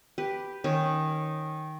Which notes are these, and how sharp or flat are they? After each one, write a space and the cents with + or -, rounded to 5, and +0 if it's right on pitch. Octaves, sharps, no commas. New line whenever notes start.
G4 +0 B4 +0
D#3 +0 C#4 -20